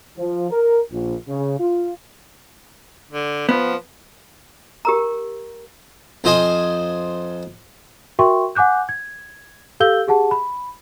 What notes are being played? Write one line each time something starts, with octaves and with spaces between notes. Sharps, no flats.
F3
A#4
A#1
C#3
F4
D3
F3 B3
G4 A#4 A#5
F2 F4 C5 D#5 G#5 C6
F#4 A#4 E5 G5 C6 C#6
F#5 G#5 D6 F#6 G6
G#6
G4 A4 F5 E6 G6 G7
G4 G#4 F#5 A5
B5